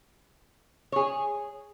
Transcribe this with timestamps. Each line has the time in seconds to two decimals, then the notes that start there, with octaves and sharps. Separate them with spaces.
0.92 G#4 C#5